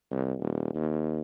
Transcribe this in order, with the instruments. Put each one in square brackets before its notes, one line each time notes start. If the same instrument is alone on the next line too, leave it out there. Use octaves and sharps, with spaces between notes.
[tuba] C2
D#1
D#2